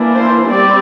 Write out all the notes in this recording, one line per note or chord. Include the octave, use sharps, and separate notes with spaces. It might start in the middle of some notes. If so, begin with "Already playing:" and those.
Already playing: E3 A#3 D4
C5
G3 C4 D5